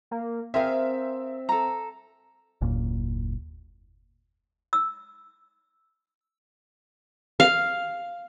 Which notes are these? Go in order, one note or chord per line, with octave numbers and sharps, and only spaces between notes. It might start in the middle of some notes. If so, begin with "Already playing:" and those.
A#3
C4 G#4 A#4 E5 F5
A4 A#5
F#1 D#2 A#2 A#3
E6
F5